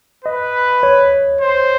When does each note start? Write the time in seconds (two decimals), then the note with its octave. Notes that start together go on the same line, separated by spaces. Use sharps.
0.25 B4 D#5
0.83 C#5
1.41 C5